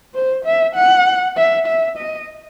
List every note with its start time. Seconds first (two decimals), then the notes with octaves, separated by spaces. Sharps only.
0.14 C5
0.45 E5
0.75 F#5
1.37 E5
1.67 E5
1.97 D#5